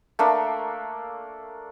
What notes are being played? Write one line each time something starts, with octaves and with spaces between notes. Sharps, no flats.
A3 A#3 D4